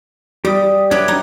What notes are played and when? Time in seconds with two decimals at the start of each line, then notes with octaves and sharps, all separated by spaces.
0.45 G3 G4 D#6
0.91 F#3 B3 D4 G4 C#5
1.08 D#4